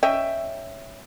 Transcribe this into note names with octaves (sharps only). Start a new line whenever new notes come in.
C#4 D#5 E5 G5